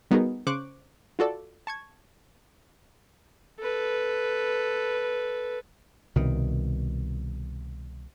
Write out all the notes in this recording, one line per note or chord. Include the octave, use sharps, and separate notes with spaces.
G3 B3 D#4 F#4 G#4 A#4
C#3 C5 C#6 D6 F#6
F4 F#4 A4 D5
A5 C#6 G#6
A4 B4
C2 B2 D#3